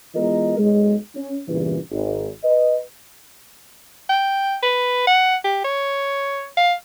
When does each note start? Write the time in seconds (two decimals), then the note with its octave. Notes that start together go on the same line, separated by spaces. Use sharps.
0.14 E3 G#3 B3 F4 A#4 D#5
0.58 B1 G#3
1.15 C#4
1.48 E2 G2 A#2 C#3 E3
1.91 G#1
2.44 B4 D#5
4.09 G5
4.63 B4
5.07 F#5
5.44 G4
5.64 C#5
6.57 F5